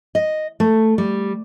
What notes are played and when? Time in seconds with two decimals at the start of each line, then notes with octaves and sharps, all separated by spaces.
0.15 D#5
0.60 A3
0.98 G3